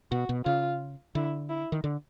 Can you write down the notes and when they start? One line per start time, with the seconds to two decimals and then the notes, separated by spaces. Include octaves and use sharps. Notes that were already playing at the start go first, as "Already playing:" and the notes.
0.12 B2 F#4
0.29 B2
0.45 C#3 F4
1.15 D3 E4
1.49 E4
1.72 D#3
1.84 D3